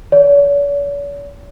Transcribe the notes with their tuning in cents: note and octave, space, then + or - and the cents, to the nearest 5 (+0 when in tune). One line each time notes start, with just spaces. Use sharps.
C#5 +45